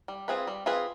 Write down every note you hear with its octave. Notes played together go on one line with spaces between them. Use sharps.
G3
C4 F4 G#4 B4
G3
C4 F4 G#4 B4